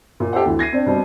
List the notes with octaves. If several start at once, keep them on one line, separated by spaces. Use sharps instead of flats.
A#2
G4 A4 C5 F#5
D2 E3
G#6 A#6 C7 D#7
C4 D4
B2 G3 C4